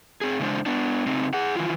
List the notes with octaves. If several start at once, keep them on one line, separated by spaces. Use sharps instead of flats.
C4 G#4
C#3 E3 G#3 D4 C5
B3 D4
C#3 C4 D#4
G#4 F#5
D#3 E3 F4